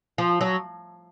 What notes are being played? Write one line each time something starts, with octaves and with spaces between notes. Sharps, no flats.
F3
F#3